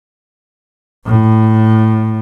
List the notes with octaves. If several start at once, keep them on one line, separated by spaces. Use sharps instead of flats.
A2